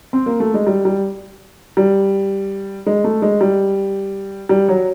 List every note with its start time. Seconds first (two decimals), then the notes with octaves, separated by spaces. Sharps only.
0.13 C4
0.26 A#3
0.40 A3
0.54 G#3
0.67 G3
0.85 G3
1.77 G3
2.86 G#3
3.04 A3
3.22 G#3
3.41 G3
4.49 G3
4.69 F#3